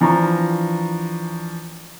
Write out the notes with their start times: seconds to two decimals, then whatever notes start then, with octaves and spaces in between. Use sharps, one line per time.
0.01 E3 F3 D4 A#5 C#6